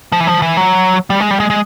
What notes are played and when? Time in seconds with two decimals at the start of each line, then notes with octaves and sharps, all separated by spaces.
0.12 F3
0.20 E3
0.27 F3
0.42 E3
0.57 F#3
1.10 G3
1.20 G#3
1.31 G3
1.40 G#3
1.50 G#3